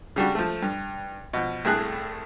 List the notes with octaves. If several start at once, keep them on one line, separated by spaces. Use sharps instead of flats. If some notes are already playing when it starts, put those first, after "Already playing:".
C#3 G3 D4 F#4
F3 A3
G2
B2 F3
C2 A2 A3 G#4 F#6